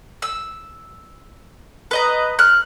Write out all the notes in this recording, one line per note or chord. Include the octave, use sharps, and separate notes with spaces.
E6
B4 D#5 A#5
F6 F#6